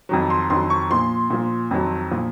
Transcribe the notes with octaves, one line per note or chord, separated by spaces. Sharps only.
F2 D#3 F#3
C6
F2 D#3 F#3 C6
C#6
A#2 F3 C6
A#2 F3
F2 D#3 F#3
A#2 F3